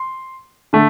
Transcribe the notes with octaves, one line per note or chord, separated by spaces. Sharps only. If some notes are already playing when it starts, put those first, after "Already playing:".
Already playing: C6
D3 A3